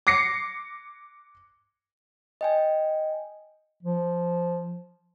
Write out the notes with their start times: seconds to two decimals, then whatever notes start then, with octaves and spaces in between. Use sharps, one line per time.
0.07 D6 A#6 C7 C#7
2.41 D#5 G5 G#5
3.83 F3